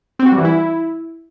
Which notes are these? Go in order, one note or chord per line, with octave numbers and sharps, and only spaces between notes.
C4
F#4
G3
E3
E4